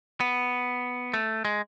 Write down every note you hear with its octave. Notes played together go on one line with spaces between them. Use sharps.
B3
A3
G#3